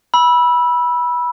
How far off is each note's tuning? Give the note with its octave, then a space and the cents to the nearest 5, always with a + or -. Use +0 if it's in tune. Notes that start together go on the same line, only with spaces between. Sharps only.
B5 -20 E6 +0